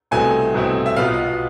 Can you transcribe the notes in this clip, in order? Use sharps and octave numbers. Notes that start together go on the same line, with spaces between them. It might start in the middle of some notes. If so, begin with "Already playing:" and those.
C2 B2 A3 C4 E4 G#5
C2 B2 A3 C4 E4
E5
B1 B2 B3 F4 F5